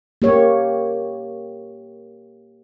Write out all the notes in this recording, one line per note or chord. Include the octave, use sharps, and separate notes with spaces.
A#3 G4 C#5